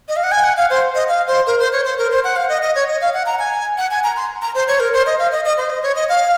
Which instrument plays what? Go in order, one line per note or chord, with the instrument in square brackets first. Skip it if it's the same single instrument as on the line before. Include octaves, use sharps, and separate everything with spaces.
[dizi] D#5
F5
F#5
G#5
F#5
F5
C5
D#5
F5
C5
A#4
C5
C#5
C5
A#4
C5
F#5
F5
D#5
D#5
C#5
D#5
F5
F#5
A#5
G#5
F#5
G#5
A#5
C6
A#5
C5
C#5
A#4
C5
D#5
F5
D#5
D#5
C5
D#5
C#5
D#5
F5